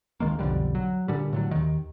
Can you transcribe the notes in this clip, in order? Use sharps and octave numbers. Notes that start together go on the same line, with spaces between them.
C#2 D#3 G#3 A#3
B1 F2 D3 G3
F#3
A#2 D3 G3
A2 D3 F#3
D#2 D#3